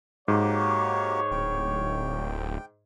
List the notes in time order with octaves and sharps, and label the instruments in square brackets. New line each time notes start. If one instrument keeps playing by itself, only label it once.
[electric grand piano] G#2 [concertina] A#3 F#4 G4 [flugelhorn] C#5
[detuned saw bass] D1 [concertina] G5